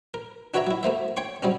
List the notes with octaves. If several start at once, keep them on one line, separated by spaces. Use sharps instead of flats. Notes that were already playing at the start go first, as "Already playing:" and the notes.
A#4
D4 F#4 B4 C#5 E5 A#5
F#3 E4
A3 A#3 C5 E5
C#5 G5 C6 C#6
F#3 G3 C4 C#4